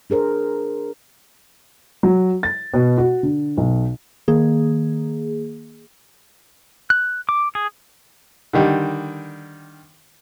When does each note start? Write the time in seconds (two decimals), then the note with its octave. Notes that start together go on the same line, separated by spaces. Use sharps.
0.10 D4 G#4 A#4 C5
2.03 F#3
2.43 A6
2.74 B2
2.98 F#4
3.23 D3
3.57 B1
4.28 D#3 A#3 G#4
6.90 F#6
7.29 D6
7.55 G#4
8.53 D3 D#3 G3